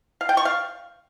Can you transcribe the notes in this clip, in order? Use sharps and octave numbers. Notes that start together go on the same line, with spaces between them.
F5
G5
C#6
F5